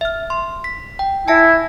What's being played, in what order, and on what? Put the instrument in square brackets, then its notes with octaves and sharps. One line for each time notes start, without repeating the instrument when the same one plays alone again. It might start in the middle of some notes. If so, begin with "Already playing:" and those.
[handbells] E5 F6
C6
B6
G5
[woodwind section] E4 [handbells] G#5 A5 A#6